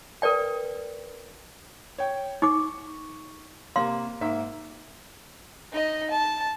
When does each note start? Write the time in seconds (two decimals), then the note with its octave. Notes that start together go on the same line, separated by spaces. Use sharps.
0.22 A#4 B4 D5 G5
1.98 C#5 G5
2.42 D#4 C#6 D6
3.76 C3 A#3 F5 C6
4.21 G#2 A#3 E5
5.72 D#4 D#5
6.10 A5